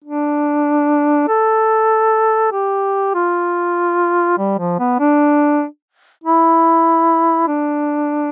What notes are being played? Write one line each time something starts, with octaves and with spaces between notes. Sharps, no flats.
D4
A4
G4
F4
G3
F3
B3
D4
E4
D4